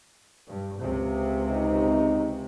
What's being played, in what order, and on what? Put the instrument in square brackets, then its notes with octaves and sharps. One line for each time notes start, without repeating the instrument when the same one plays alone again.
[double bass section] G2
C#2 C3
[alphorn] D#4